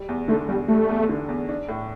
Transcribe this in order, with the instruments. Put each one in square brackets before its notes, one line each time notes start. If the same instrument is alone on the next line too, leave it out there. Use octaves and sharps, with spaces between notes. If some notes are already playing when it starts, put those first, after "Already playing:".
Already playing: [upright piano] G3
E2
[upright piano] D3 [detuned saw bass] A3
[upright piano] E2 [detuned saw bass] G3
[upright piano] G3 [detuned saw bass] A3
[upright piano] E2
D3
E2
D4
A2